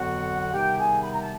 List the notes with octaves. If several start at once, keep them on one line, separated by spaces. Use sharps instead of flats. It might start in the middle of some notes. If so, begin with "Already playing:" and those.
Already playing: F2 D3 F#3 B3 F#4 F#5
C3 D#3 G3 B3 D#4 G4 G5
G#4 G#5
B5
A#5
A5